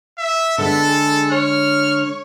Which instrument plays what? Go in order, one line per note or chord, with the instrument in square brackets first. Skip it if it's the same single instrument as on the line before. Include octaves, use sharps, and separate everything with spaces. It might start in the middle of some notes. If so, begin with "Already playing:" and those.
[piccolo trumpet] E5
[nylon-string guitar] D3 G#3 [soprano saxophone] B3 [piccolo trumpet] A4
[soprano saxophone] G#4
[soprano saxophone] C#5 [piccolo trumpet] F6